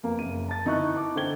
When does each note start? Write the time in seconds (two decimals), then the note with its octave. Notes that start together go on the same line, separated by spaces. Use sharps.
0.03 F2 A#3 B3
0.19 F#1 D#7
0.48 A5 A6
0.65 G1 D#4 E4 C#6 F#6
0.95 A5 D6
1.15 D3 A4 C5 G5 G#6 G7